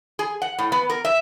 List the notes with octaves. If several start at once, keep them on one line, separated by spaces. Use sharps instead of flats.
G#4
F#5
A2
B3
A#4
E5